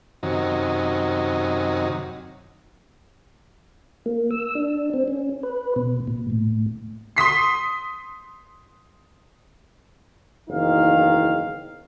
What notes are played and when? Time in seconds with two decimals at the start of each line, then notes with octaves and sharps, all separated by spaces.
0.23 F#2 C3 D#3 F#3 D#4
4.06 A#3
4.31 E6
4.55 D4
4.94 C4
5.08 C#4
5.43 B4
5.76 B2
6.07 A#2
6.30 A2
7.16 C6 D#6 B6 C7
10.49 F#1 E2 D#3 D#4 F5